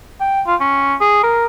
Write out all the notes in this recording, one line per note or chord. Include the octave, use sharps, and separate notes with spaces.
G5
F4
C#4
G#4
A#4